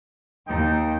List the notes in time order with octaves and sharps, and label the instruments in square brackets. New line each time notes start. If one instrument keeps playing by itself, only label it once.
[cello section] D#2 [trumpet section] D#4 G5